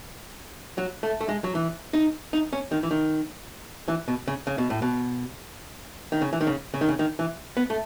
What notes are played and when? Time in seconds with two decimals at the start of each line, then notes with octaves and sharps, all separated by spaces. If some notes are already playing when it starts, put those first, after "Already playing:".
0.78 F#3
1.03 A3
1.21 A3
1.29 G#3
1.44 F#3
1.55 E3
1.93 D#4
2.33 D#4
2.53 C#4
2.72 D#3
2.83 E3
2.91 D#3
3.88 E3
4.08 B2
4.28 C#3
4.47 C#3
4.58 B2
4.70 A2
4.82 B2
6.12 D#3
6.21 C#3
6.33 E3
6.41 D#3
6.47 C#3
6.74 C#3
6.81 D#3
6.89 C#3
6.99 D#3
7.19 E3
7.57 B3
7.70 A3